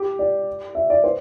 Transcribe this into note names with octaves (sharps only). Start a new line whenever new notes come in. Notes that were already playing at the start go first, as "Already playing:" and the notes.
Already playing: G4
D5
E5
D5
C5